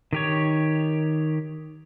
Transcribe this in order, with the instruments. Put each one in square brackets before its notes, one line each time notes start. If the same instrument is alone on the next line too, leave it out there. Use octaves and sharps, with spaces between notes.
[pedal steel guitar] D#3 G4 C#5